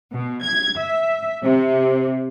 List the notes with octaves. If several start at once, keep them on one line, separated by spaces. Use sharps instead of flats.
B2
G#6
E5
C3